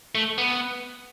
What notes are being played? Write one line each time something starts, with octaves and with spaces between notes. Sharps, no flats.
A3
B3